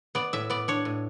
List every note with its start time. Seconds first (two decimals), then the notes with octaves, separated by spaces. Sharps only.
0.15 B3 D5
0.33 A2 E5
0.50 B3 D5
0.68 D4 C#5
0.85 A2